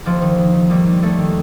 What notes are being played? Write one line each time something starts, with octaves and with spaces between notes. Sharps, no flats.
D#2 F3
D#3
D#3
D#3
D#2 G3
D#2
D#2 A3
D#3